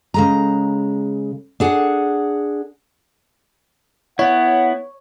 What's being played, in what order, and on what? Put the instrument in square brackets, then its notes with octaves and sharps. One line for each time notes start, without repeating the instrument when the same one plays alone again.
[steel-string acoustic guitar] C#3 G#3 A#5
D4 G#4 F#5
[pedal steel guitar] B3 E4 [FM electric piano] C#5 [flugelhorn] F#5